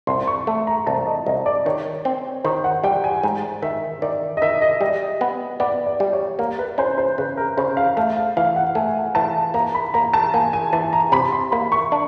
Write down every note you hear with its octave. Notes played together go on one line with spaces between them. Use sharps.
C2 C6
C#6
A3
A#5
C2 A5
D#5
C2 D#5
D5
D#3 C#5
C4
D#3 C5
F#5
G3 G5
G#5
G#2
D#3 E5
D#3 D5
D#5
D#3 E5
D#5
G3
B3
B3 D5
D5
G3
C#5
A#3 A#4
B4
C#4 C5
C5
C#3 B4
A#4
C#3 C5
F5
A3 F5
F5
E3 F5
F#5
A3 G#5
E3 A5
A#3 A#5
B5
A#3 A#5
A5
A#3 G#5
G#5
E3 A5
A#5
C3 B5
C6
A#3 B5
C#6
D4